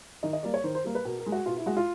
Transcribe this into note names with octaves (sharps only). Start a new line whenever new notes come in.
D#3 D#5
D#5
G3 A#3 D5
C#5
D#3 C5
C5
G3 A#3
B4
B2 A#4
A#4
G#3
F#4
B2 F4
E4
G#3 F#4
F4